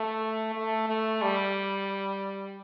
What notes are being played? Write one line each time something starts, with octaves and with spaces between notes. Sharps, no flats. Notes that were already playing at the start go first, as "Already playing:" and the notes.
Already playing: A3
A3
A3
G3